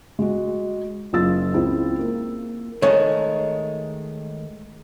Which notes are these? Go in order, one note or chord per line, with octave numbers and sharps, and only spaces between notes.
G#3 F#4
F#1 F4 E6 A6
C#2 C4 E4
A#3
D#3 G#3 A3 C#5